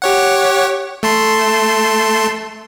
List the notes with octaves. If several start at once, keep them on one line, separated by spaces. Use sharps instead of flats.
G4 C#5 F#5
A3 A5 C6